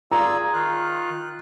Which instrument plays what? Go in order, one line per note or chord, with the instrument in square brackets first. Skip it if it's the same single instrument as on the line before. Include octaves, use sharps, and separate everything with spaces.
[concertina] F4 D5 E6 [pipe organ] G#4 [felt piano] A#5
[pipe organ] D#3 F4 [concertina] F#6